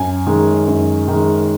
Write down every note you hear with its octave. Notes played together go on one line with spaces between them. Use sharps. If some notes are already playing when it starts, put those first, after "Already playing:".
Already playing: F#2 G#5
D#3 G#3
F#2
D#3 G#3